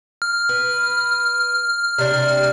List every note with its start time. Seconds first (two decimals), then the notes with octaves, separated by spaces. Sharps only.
0.22 F6
0.49 B4
1.98 C3 D4